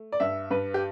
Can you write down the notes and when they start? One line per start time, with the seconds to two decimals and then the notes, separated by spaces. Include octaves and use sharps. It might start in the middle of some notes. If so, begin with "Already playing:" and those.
Already playing: A3
0.12 D5
0.20 G2 E5
0.51 G2 B4
0.74 G4